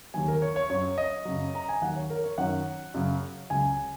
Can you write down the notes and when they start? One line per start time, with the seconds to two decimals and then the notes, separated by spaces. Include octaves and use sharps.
0.14 D#2 D#3 F#3 G#5
0.28 A#4
0.42 C#5
0.56 C#5
0.70 F#2 F#3 C#5
0.98 D#5
1.25 F#2 C#3 F#3
1.55 A#5
1.69 G#5
1.82 D#2 D#3 F#3 F#5
1.96 C#5
2.10 A#4
2.24 C#5
2.38 F#2 D#3 F#3 F#5
2.94 F#2 C#3 F#3
3.50 C#2 C#3 F#3 G#5